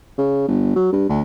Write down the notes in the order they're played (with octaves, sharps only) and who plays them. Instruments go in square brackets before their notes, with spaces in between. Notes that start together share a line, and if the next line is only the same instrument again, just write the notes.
[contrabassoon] C#3
G1
F#3
G2
D2